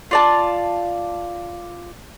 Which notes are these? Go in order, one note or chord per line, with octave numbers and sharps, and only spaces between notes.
F4 D5 A5